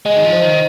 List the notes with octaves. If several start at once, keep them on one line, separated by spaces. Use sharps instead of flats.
G#3 D#5
D#3
F3
C5
D#3